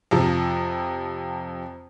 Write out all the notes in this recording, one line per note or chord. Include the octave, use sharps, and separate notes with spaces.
F2 C3 F3